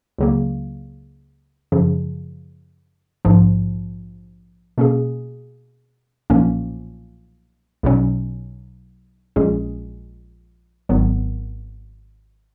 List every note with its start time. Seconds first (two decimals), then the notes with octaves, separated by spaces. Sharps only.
0.18 C#2 C#3 F#3 A#3
1.72 F#2 C#3 F3
3.25 A#1 G#2 F3
4.78 B2 A#3 C#4 G#4
6.30 B1 A#2 F3 A#3 C#4
7.83 B1 B2 F#3 C#4
9.36 A#1 A#2 G#3 C#4 G#4
10.89 G#1 G#2 D#3 F#3 B3